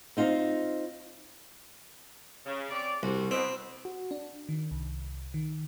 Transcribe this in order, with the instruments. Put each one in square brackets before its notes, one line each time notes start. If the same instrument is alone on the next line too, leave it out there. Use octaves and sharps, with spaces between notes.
[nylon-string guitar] C4 D#4 F4
[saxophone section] C#3
C4 C#5 D5
[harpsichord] C2 [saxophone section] C4 F#4
[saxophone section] B2 [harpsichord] C4
[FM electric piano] F#4
D4
D#3
C2
D#3